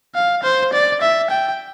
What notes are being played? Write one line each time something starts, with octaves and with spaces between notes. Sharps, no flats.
F5
C5
D5
E5
G5